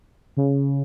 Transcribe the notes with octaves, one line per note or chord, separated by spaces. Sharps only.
C#3